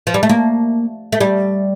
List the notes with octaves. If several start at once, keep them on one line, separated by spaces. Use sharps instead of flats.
F3
G3
A3
A#3
A3
G3